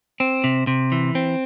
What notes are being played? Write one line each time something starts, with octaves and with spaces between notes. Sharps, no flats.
C4
C3
C3
E3
C4